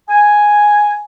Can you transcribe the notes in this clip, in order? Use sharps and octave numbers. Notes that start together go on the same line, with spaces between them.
G#5